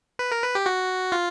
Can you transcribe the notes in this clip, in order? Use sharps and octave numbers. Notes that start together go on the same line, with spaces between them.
B4
A#4
B4
G4
F#4
F4